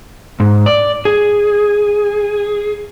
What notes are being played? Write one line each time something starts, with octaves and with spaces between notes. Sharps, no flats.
G#2
D5
G#4